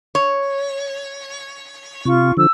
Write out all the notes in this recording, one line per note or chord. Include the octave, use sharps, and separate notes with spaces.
C#5
C3 F4 C#6
D3 F3 E6